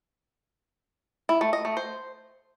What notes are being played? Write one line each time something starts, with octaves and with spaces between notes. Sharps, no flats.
E4
A3
D#5
A3
C5